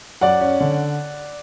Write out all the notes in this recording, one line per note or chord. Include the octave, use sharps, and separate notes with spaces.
F#2 D5 F#5
C#4
D3